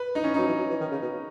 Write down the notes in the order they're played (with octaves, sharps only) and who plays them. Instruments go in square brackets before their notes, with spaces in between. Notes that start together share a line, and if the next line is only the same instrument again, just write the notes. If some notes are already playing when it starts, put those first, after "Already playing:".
Already playing: [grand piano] B4
D#4
[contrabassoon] E3 [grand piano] C#4
[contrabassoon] F#3 [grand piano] D#4
[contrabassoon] E3
F#3
E3
D#3
C#3
B2